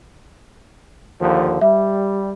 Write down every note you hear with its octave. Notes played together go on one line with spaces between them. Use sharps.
D#2 D3 F3
G3 E5